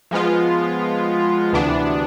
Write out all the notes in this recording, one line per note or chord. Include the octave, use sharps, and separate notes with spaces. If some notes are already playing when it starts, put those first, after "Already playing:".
F3 G#3 B3 F4
D2 C3 E3 B3 D4